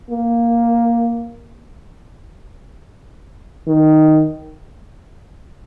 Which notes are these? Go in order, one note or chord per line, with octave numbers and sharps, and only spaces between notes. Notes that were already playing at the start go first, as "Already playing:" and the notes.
A#3
D#3